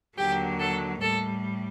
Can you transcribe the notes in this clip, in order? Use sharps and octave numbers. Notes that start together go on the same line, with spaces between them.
D#2 D3 F#3 G4
A4
A2 G3 A4